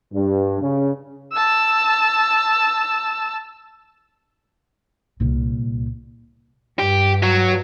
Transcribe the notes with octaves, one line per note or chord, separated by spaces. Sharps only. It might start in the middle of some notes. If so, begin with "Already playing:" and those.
G2
C#3
A5 E6
C2 A#2
G2 G4
F#3